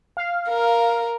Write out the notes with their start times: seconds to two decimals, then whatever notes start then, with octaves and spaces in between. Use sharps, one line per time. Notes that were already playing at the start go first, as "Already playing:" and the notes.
0.17 F5
0.49 A#4